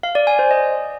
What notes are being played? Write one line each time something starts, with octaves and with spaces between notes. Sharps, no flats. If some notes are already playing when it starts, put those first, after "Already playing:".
F5
D5
G#5
C5
D#5